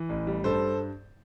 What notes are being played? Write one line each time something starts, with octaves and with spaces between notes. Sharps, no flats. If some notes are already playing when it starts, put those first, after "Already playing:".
Already playing: E3
A1
G3
G2 A4 C5